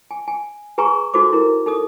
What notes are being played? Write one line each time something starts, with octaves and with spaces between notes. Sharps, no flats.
G#5
G#5
G#4 B4 G#5 A#5 C#6
D#4 F#4 A4 C5 D6
E4 A#4
D#4 A4 D#6